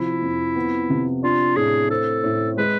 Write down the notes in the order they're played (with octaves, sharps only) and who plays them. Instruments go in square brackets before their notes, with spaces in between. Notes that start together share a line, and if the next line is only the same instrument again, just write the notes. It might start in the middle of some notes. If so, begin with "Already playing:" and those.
Already playing: [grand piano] C3 F3 [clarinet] E4
[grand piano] F2
B3
C3
[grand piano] D4 [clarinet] F4
[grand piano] A2 [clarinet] G#4
[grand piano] C4 [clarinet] A4
[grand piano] A2
[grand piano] G#3 [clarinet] B4